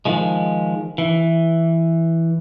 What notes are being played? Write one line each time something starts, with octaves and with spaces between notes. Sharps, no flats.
D#3 F3 G#3
E3